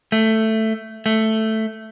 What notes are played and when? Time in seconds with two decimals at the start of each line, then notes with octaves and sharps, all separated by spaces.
0.12 A3
1.06 A3